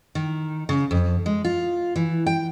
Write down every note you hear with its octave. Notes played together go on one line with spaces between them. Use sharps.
D#3
C#3
F2
G#3
F4
E3
G5